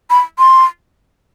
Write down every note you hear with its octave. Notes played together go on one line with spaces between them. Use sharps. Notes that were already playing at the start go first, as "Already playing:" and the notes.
B5
C6